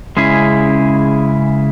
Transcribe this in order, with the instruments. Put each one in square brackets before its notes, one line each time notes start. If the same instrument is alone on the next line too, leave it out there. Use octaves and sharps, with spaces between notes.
[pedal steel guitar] C#3 G#3 C#4 E4 G#4